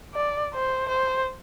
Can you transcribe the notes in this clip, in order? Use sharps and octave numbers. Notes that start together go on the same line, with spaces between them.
D5
C5
C5